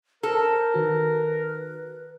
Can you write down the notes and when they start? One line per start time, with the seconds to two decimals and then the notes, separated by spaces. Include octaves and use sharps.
0.23 A4 A#4 C5
0.74 D#3 F#4 B4